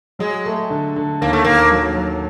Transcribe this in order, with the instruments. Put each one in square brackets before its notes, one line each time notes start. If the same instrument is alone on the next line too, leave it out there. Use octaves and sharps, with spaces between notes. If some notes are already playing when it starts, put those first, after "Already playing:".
[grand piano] F#3 [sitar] G#3
[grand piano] A3
D3
D3
[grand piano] D#2 [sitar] A#3
[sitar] A3
[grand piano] D#2 [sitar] A#3
[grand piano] F#3
F#3